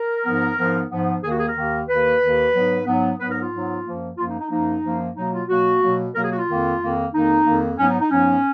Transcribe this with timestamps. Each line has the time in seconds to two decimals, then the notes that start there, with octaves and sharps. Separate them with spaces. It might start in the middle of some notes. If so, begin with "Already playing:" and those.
Already playing: A#4
0.24 G#2 F3 B3
0.58 G#2 F3 B3
0.90 G#2 F3 B3
1.23 D#2 D#3 A#3 G#4
1.31 F#4
1.40 G#4
1.47 A#4
1.56 D#2 D#3 A#3
1.89 D#2 D#3 A#3 B4
2.21 D#2 D#3 A#3
2.54 G#2 F#3 B3
2.86 G#2 F#3 B3
3.20 G#2 F#3 B3 B4
3.31 A#4
3.41 F4
3.52 G#2 F#3 B3
3.85 F#2 F3 A#3
4.17 F#2 F3 A#3 F4
4.29 D#4
4.40 D#4
4.50 F#2 F3 A#3 D#4
4.83 F#2 F3 A#3
5.16 B2 F#3 A#3 D#4
5.32 F4
5.49 B2 F#3 A#3 F#4
5.81 B2 F#3 A#3
6.14 B2 F#3 A#3 A#4
6.23 G#4
6.31 F#4
6.38 F4
6.47 F2 D#3 A#3
6.80 F2 D#3 A#3
7.13 F2 D#3 A#3 D#4
7.45 F2 D#3 A#3
7.78 G#2 F#3 B3 C#4
7.88 D#4
8.01 D#4
8.10 G#2 F#3 B3 C#4